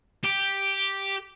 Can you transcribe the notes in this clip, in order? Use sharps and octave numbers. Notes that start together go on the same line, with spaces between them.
G4